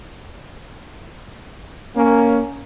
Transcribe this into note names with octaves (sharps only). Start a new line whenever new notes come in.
A#3 C#4